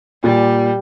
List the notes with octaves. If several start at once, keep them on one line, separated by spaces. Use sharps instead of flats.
A#2 G3